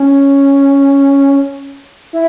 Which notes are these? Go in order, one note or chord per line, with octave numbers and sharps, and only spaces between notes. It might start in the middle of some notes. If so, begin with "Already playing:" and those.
Already playing: C#4
E4